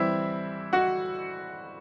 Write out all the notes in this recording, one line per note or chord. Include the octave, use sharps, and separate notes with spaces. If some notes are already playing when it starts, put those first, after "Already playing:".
Already playing: E3 G3 C4 E4 E5
F#4 F#5